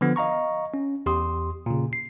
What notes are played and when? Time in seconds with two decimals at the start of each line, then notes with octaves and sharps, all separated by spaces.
0.01 D3 F3 B3
0.16 D#5 F5 A#5 C#6
0.74 C#4
1.06 E2 G4 C6 D#6
1.66 A#2 C#3
1.93 C7